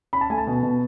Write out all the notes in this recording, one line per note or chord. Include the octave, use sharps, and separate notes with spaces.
C#4 B5
A5
A3 G#5
A5
B2
B2